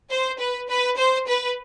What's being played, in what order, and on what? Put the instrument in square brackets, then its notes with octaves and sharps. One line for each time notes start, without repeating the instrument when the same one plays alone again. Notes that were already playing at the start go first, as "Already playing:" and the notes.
[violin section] C5
B4
B4
C5
B4